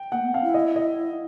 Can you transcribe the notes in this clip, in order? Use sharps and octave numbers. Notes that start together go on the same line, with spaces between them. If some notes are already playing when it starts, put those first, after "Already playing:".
Already playing: G5
A#3 F#5
B3
C4 F5
E4
D#5
D#5